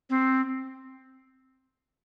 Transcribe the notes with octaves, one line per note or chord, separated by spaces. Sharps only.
C4